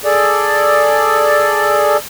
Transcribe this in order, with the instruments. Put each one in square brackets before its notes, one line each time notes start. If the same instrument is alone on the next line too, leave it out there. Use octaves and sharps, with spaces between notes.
[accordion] G#4 A4 D5